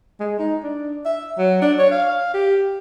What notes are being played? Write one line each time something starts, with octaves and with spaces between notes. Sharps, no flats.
G#3
D#4
D4
E5
F#3
D4
C#5
F5
G4